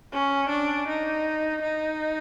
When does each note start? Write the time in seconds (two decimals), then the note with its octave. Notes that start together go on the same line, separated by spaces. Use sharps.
0.12 C#4
0.49 D4
0.87 D#4
1.62 D#4